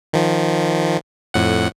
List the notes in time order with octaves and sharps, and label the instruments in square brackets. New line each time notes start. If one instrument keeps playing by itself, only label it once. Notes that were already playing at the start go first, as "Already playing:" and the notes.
[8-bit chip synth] D#3 F3
F2 A2 F#5